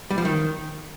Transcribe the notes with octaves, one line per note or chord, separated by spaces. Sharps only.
G3
F3
D#3